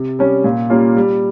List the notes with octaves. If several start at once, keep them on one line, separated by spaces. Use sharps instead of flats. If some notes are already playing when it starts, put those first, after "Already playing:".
Already playing: C3
G3 C#4
A#2
G3 A#3 C#4 F4
G3